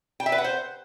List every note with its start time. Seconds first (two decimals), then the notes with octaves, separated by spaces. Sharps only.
0.20 G5
0.26 E5
0.32 B4
0.38 F#5
0.44 C5